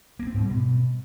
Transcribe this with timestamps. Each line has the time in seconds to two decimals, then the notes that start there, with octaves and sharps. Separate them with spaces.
0.19 A#3
0.27 C4
0.34 G#2
0.42 G3
0.49 B2